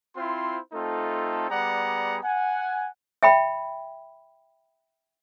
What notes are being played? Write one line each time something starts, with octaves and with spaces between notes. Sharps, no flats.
C4 E4 F4 C5 C6
A3 C4 D#4 F4 A4
G3 B3 G#4 D5 F#5 A#5
F#5 G#5
E5 G5 B5